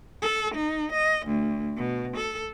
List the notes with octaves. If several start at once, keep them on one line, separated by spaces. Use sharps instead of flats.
A4
D#4
D#5
D2
B2
A4